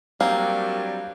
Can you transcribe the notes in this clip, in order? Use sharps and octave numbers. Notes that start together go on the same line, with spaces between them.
F#3 G3 A#3 C4 D4 F5